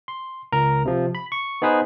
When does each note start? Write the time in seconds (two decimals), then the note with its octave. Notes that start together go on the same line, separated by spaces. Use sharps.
0.08 C6
0.52 C#2 A#4 A#5
0.85 C3 F3
1.15 B5
1.32 C#6
1.62 B3 D#4 G#4 B4 C5